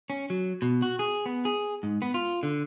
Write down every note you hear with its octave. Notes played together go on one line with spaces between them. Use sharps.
C#4
F#3
B2
F#4
G#4
B3
G#4
G#2
B3
F4
D3